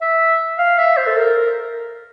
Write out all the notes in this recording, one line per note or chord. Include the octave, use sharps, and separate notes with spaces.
E5
F5
E5
C5
A4
A#4